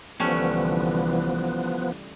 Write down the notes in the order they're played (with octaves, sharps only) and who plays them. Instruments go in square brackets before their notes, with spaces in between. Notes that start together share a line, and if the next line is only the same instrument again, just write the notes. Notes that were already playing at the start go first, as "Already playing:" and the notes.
[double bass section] C2 D3 E3 [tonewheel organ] F3 B3 [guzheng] G3 A3 C#4